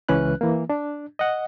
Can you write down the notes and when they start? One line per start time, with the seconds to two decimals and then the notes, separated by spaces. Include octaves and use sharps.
0.09 C#2 E3 C#4 B4 F#6
0.41 E3 A#3
0.70 D4
1.19 D#5 F#5